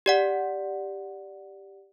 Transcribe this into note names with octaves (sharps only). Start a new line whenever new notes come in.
G4 D5 F#5